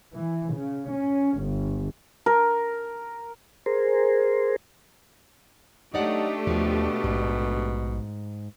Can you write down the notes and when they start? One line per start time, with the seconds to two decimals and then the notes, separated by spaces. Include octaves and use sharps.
0.13 E3
0.56 C#3
0.93 C#4
1.43 G1
2.26 A#4
3.66 G#4 A#4 C5
5.94 F#3 A3 D4 D#4 G4 D5 F#5
6.47 D#2 B2 F3
7.04 A#1 G#2